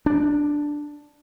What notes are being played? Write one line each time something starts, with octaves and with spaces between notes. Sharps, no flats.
D4